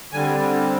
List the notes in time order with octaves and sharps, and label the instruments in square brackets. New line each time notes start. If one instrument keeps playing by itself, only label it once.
[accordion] D3 G3 C4 G#5